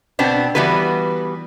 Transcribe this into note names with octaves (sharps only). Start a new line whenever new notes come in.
B2 B3 C4 D4
E3 G3 B3 F#4 B4